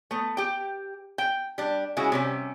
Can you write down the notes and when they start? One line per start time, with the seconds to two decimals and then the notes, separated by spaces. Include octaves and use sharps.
0.11 A3 B3
0.37 G4 G5
1.18 G5
1.58 G3 D4
1.97 C#3 G#3 E4 F#4
2.12 C3 G3 C#4